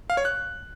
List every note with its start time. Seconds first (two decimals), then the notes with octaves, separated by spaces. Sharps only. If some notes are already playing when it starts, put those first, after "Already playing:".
0.10 F5
0.17 C#5
0.25 F#6